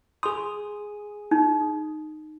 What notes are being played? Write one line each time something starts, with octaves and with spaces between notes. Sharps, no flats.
G#4 C6 D#6
D#4